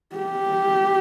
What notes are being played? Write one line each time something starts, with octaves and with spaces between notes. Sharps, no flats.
G4